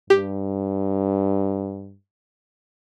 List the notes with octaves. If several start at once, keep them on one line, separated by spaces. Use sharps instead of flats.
G2 G4